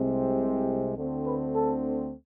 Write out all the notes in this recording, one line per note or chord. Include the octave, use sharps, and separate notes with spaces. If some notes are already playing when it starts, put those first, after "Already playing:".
Already playing: C2 C3 G#3 C4
D2 D3 A3 C4
B4
A4